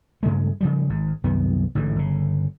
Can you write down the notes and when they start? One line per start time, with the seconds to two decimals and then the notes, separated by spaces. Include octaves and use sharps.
0.23 G2 C#3 G#3 A3
0.61 C#3 F3 G3
0.89 G#1 G#2
1.24 C2 F#2 D#3 B3
1.75 A1 G#2 D3 E3
1.96 G1 C#3